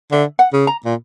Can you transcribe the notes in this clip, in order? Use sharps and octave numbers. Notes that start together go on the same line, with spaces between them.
D3 E5
F#5
C#3
A#5
A#2